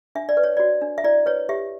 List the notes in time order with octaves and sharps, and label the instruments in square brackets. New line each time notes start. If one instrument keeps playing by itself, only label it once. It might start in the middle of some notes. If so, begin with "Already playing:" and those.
[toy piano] D4 E5
D5
B4
C#5
F#4 D5
D4
E5
E4 D5
B4 C#5
G4 E5